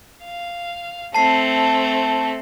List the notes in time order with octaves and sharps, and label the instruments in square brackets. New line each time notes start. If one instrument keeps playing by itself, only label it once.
[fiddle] F5
[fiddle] A3 C4 [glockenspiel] A5 C7